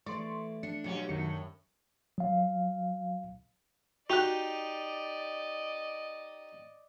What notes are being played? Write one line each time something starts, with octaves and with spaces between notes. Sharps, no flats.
E3 A3 D5 C6 C#6
D4 C#7
G2 B2 F#3 C#4 G4
F#2 A2 D#3 C#7
F#3 F5
D#4 F#4 G4 D5 D#5 F#6